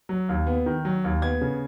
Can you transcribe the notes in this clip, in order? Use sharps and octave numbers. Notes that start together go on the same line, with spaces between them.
F#3
D#2
B3
D#3
F#3
D#2
B3 G#6
C#3